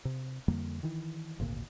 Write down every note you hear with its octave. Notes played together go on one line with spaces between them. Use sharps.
C3
F2 D3 G3 A#3
D#3 E3
G#1 D2 A#2